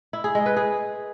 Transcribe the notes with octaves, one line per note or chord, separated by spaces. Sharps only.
E4
G#4
G#3
B4
G#4